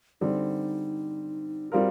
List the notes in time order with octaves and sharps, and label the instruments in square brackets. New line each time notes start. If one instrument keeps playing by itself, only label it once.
[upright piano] D3 G3 C4 [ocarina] D#4
[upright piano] G3 C4 F4 A#4 [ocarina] G4